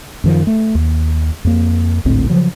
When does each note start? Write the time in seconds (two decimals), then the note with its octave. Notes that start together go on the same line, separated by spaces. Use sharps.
0.24 F#2 D#3 F3
0.47 A3
0.75 D#2
1.45 F2 A#3
2.05 G#1 D2 A2 C4
2.30 C#3 F3 F#3